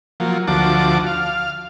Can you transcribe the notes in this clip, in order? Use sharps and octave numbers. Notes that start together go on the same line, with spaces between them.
F3 F#3 A#3
D2 F3 F#4 A5 D6
F5